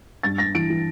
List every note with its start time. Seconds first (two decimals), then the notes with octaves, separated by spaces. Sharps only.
0.23 G2 A6
0.38 G2 A#6
0.55 E3 D7
0.70 E3